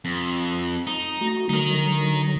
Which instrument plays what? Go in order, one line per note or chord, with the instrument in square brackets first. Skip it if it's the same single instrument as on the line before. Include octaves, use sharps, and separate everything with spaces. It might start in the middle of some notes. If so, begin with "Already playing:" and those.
[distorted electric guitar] F2
D#4
[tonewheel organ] A3 F#4
[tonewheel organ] D3 F#3 [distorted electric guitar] D#4 A#4